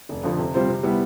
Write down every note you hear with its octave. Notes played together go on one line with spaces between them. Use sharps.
F1
F2 D3 F3
C3
G3 C4 F4 C5
C3
G3 B3 E4